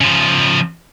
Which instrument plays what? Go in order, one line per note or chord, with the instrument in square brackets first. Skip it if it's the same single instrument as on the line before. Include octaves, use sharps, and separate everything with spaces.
[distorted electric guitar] C#3 F3